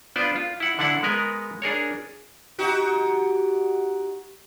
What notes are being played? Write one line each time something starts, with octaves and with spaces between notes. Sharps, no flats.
B3 D4 F4 C5 D5
F4
E4 F#5
D3 D4 E4 F#5
G#3 B3 A#4 B4
D4 G#4 A#4 C#5
D#4 F#4 G4